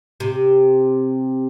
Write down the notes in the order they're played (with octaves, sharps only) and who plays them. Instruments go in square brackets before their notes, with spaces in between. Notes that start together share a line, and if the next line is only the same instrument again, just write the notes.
[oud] C3